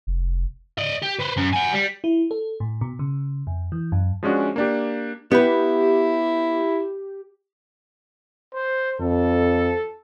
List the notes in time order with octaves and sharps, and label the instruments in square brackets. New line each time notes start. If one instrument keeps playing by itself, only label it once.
[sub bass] F1
[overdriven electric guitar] D5 D#5
G4
B4 C5
F#2
F#5 G#5
G3
[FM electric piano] E4
A4
A2
B2
C#3
F2
E3
F#2
[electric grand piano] F3 G#3 C#4 D4 F#4
A#3 D4 G4
[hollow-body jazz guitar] B3 B4 [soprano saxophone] E4 [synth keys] G4
[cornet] C5
[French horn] F2 [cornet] A4